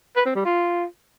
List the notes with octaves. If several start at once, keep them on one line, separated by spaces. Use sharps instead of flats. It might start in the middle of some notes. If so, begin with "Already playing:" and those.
B4
C4
G3
F4